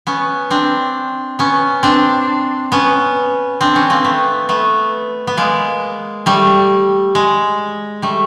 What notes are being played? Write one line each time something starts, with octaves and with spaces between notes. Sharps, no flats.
B3 C#4
C4 D4
B3 C#4
C4 D4
B3 C#4
C4 D4
B3 C#4
A#3 C4
A3 B3
A3 B3
B3
G#3 A#3
G3 A3
G#3
G3 A3